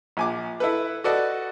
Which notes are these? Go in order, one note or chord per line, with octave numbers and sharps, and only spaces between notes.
A#1 G#5 D6
E4 A4 B4
F#4 A4 B4 D5 D#5 F#5